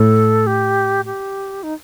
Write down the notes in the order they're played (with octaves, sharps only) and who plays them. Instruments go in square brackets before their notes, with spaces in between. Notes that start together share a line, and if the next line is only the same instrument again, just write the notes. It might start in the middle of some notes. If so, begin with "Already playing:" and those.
Already playing: [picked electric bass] A2 [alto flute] A4
[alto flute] G4
G4
D#4